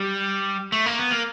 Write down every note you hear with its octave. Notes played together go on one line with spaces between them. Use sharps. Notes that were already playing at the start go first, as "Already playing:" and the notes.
Already playing: G3
A3
A#3
B3
A#3